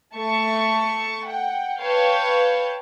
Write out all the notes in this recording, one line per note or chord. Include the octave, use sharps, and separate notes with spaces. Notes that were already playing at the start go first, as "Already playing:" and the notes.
A3 A5 C#6
F#5 G5
B4 C#5 F5 G5 A5 G6